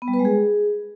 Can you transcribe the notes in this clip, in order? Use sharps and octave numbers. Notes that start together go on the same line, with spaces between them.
B3
G3
B4
G#3
G#4